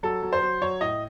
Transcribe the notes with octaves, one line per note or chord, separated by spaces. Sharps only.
F#3 A4
F#3
C5
F#3
F#3 C#5
A2 D#5